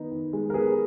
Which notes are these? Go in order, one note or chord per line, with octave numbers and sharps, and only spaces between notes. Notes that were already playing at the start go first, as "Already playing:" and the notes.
Already playing: D#3 B3 D#4
D#3
G#3
A#4
B3 G#4 B4